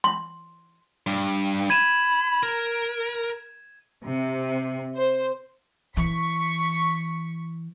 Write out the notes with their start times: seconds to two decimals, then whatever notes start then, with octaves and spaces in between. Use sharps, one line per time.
0.04 C6
1.07 G2
1.70 B5 G#6 D#7 E7
2.43 A#4
4.03 C3
4.96 C5
5.97 E3 C#6 B6